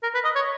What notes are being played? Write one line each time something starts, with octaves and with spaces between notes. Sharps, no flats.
A#4
B4
D#5
C#5